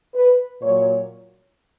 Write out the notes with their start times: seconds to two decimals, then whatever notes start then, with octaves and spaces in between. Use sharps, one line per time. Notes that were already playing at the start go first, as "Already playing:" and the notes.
0.14 B4
0.61 A#2 F#3 C#5